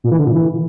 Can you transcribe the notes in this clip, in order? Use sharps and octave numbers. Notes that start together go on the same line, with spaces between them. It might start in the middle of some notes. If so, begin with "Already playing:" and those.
A#2
E3
D3
A#2
E3